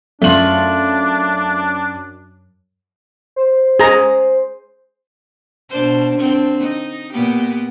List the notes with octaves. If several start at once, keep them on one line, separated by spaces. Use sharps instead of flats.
F#2 A3 D4 F4 F#7
C5
G#4 A#5
B2 D4 C5
D3 C4 D4
D#4
A#2 B3 G4